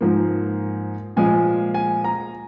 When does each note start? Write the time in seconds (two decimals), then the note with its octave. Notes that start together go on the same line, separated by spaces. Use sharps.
0.01 G#2 F3 A#3
1.17 A#2 F3 G#3 G#5
1.74 G#5
2.04 A#5